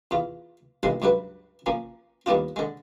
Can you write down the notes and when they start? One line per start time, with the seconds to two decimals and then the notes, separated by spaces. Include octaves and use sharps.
0.11 E2 F4
0.83 A1 G2 A#2 G#3 C6
1.02 C#2 G2 F#3 B4
1.66 F3 A#3 C#4
2.26 D#2 G3 B3 D4 F4
2.56 D3 G#3